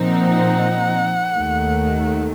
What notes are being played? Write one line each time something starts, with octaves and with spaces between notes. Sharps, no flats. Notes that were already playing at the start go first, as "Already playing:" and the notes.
Already playing: A#2 F3 C4 D#4
F#5
D#2 D#3 A3